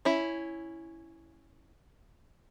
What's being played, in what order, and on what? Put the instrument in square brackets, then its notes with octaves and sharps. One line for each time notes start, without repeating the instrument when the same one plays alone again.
[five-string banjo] C#4 E4